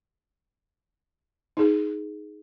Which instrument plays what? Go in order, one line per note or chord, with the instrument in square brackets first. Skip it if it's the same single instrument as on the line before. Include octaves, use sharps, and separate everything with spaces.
[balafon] D#4 G#4